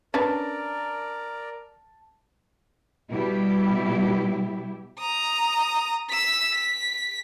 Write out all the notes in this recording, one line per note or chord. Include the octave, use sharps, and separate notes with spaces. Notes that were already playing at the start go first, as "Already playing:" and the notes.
C#4 D4 A#4 B4 D5 A5
B2 G3 E4 G4
A#5 D#6
E6 B6
B6